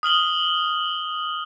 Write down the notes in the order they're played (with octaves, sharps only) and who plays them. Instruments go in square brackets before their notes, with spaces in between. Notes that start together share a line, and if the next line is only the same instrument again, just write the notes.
[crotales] D#6 F6 F#7 G7